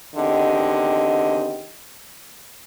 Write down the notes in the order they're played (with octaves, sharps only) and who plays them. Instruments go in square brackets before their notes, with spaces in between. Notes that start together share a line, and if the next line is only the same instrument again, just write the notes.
[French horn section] E2 D3 D#3 C4 G4 D#5